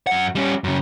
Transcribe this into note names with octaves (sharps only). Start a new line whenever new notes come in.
F#2 F#5
G3 C#4
F#2 C#3